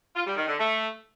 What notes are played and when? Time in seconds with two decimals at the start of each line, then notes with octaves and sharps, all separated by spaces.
0.15 F4
0.25 G3
0.36 D#3
0.47 D3
0.57 A3